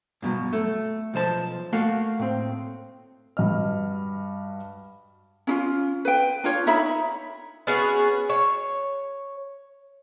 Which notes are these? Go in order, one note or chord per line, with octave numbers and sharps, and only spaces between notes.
G2 B2 F#3
A3
B1 F3 C5 A5
A3 A#3 F#4 F5
A2 C4
G2 F#4 D#5 F6
C#4 E4 F4
B4 G5
D4 F4 C#5
D#4 C#5 E5 B5
B3 C#4 F#4 G#4
C#5